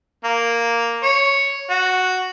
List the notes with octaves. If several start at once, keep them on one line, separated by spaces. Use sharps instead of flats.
A#3
C#5
F#4